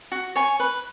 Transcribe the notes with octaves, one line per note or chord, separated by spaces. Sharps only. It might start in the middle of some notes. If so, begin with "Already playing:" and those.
F#4
C#5 G#5 C#6
B4